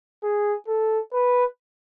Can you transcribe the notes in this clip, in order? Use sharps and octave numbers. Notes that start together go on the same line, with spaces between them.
G#4
A4
B4